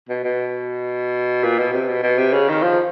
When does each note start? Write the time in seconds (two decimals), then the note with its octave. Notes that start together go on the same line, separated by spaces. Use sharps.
0.09 B2
0.24 B2
1.44 A#2
1.59 B2
1.73 C3
1.88 B2
2.03 B2
2.18 C3
2.33 C#3
2.49 D#3
2.63 F3